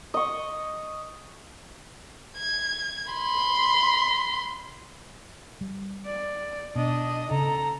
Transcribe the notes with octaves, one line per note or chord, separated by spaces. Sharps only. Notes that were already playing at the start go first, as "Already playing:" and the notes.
D#5 C#6
G#6
B5 C6
G3
D5
B2 D4 D#5
C#3 A4 A#5